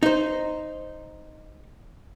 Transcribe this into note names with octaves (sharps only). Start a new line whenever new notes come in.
D#4 C5